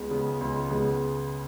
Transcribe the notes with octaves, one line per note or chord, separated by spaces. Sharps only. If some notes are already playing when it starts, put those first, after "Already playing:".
Already playing: C#2 C#3 G#3 B3
C#2 C#3 G#3 B3
C#2 C#3 G#3 B3
C#2 C#3 G#3 B3